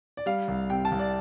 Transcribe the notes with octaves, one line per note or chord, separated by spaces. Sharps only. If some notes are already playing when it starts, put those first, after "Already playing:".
D5
G3 F5
C2
C3 G5
A5
C2
D5